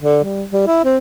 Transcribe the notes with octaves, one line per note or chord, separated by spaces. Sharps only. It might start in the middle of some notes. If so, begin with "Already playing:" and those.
D3
G3
G3
E4
C4